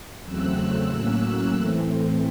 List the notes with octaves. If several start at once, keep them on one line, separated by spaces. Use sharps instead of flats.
E2 C#3 F#3 A3 C4 E6 F#6
A2 F#3 A#3 C#4
A2 E3 A3 C4